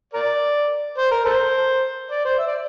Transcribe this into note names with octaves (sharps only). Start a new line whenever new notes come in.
A#4 D5
C5
A#4
A4 C5
D5
C5
E5
D5